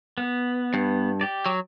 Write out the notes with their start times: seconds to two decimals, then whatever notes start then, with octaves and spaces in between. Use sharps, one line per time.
0.18 B3
0.74 G2
1.21 G4 D5
1.46 F#3